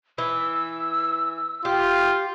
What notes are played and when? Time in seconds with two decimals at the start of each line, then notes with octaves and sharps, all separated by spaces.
0.18 E3 E6
1.65 F4 G4